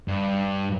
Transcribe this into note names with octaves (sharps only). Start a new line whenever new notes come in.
G2